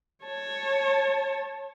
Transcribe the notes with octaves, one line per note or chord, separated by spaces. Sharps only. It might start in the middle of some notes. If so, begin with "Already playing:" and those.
C#5 A5